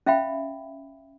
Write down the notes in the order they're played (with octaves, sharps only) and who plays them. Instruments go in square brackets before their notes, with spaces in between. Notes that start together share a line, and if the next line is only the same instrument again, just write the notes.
[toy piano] C#4 E5 F5 G5 B5